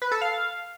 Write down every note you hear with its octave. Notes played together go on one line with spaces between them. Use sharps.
B4
A4
F5